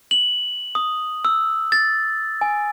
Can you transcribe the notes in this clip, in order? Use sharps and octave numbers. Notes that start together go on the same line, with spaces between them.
F#7
D#6
E6
A6
G#5